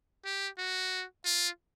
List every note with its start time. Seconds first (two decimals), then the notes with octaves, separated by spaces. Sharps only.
0.25 G4
0.58 F#4
1.25 F4